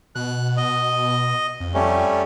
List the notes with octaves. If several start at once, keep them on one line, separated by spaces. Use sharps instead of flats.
B2 F#6
D#5
F2
G3 A3 C#4